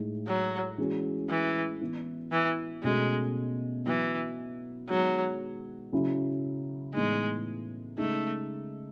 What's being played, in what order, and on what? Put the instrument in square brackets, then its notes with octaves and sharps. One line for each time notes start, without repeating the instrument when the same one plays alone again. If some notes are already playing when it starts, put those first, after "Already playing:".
Already playing: [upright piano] A2 G#3 D#4
[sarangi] F#3
[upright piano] E3 G#3 C#4 F#4
[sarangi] E3
[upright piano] E3 B3 E4
[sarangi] E3
[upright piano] B2 A3 C#4 F#4 [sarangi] G#3
[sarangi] E3 [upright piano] F#3 B3 E4
[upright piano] D#3 G#3 B3 F#4 [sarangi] F#3
[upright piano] C#3 F#3 C#4 E4
[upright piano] A2 E3 B3 D#4 [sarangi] G#3
[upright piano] C#3 G#3 D#4 [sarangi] A3